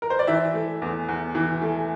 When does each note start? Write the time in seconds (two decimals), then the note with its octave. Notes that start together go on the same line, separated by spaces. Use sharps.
0.02 A#4
0.10 C5
0.19 D5
0.27 E3 E5
0.54 A3
0.82 E2
1.09 E2
1.35 E3
1.62 A3